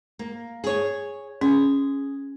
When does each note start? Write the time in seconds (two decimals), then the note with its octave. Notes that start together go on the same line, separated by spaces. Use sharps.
0.19 A#3
0.64 G#4 C#5
1.41 C#4 G#4